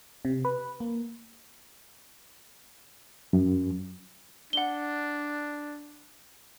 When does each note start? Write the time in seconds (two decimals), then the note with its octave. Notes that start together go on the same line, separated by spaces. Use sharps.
0.25 C3
0.45 B4
0.80 A#3
3.33 F#2
4.53 D4 F#5 G7